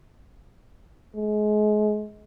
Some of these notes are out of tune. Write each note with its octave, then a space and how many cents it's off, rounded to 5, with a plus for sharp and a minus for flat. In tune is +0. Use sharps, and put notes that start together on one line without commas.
G#3 +30